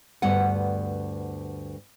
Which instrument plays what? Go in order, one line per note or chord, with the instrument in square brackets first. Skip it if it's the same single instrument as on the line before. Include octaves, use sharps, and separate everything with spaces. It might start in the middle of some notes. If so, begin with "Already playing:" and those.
[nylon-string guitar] D2 G2 B3 F#5